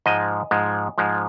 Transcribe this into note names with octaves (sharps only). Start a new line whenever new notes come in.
G#2 F3 G#3 D#5
G#2 F3 G#3
G#2 F3 G#3